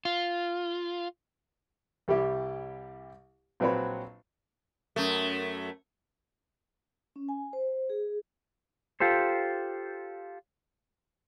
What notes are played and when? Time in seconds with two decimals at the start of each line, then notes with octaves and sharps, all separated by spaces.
0.05 F4
2.08 C2 G3 E4 G4 E5
3.60 A#1 F#3 C4 B4 C#5 B5
4.96 F#2 A3
7.16 C#4
7.29 G#5
7.53 C5
7.90 G#4
9.00 F4 G4 A4 C5